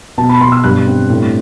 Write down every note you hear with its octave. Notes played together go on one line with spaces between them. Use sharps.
B2 A5
B5
B2 C6
E6
G2 F#6
C4
A2